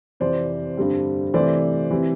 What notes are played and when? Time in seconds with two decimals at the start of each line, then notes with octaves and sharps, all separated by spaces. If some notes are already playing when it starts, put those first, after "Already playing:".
0.20 F2 C3 E3 C5 D5
0.77 G2 D3 G3 C4
1.34 C3 E3 A3 C5 D5
1.91 C3 E3